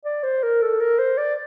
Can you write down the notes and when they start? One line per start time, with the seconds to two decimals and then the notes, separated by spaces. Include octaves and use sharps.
0.05 D5
0.24 C5
0.43 A#4
0.62 A4
0.80 A#4
0.99 C5
1.18 D5